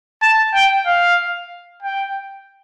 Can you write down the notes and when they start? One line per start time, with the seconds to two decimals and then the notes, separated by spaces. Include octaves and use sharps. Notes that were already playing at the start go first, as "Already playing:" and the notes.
0.23 A5
0.54 G5
0.87 F5
1.83 G5